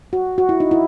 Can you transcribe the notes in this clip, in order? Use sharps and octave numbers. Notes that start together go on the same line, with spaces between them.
F#4
F#4
E4
D#4
E4